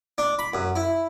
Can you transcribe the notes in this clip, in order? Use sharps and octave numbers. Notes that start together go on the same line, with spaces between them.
D4
B5
F#2
E4